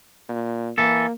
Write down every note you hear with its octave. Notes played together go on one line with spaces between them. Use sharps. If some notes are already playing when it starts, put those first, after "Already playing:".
A#2
E3 A#3 A4